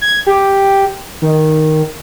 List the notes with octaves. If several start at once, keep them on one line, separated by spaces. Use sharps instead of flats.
G#6
G4
D#3